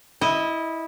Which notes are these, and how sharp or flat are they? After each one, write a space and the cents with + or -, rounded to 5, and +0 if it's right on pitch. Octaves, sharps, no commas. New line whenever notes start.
E4 -15 D#5 +0